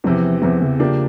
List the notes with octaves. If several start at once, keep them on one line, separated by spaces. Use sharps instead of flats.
E2 C3 E3 F3
E2 C3 E3 F3
C#3
F3 A#3 D4 G4